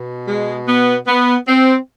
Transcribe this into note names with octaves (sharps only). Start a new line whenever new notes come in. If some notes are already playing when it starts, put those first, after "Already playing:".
Already playing: B2
G#3
B3
B3
C4